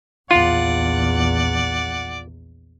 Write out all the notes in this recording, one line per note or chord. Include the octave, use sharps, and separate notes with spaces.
A#1 E2 F4 D5 F#5